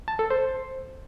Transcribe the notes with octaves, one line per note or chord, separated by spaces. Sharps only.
A5
A4
C5